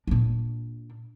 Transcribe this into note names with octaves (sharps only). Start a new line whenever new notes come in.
A#2 D4